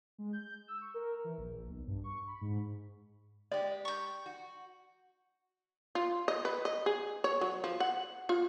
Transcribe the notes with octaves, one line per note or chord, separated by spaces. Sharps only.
G#3
G6
E6
C#6
A#4
E3
A#1
B1
G2
C#6
B5
G#2
G#3 G4 D5
C#6 G6
F#4
F4
D#5
B4
D#5
G#4
C#5
F#3
F3
F#5
F4